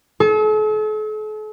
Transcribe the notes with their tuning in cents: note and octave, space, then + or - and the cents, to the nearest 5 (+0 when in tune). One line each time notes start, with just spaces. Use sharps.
A4 -45